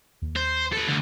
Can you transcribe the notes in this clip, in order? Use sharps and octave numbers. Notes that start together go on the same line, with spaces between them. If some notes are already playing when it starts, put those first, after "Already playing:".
D#2
C5
A4 B4
D2 D3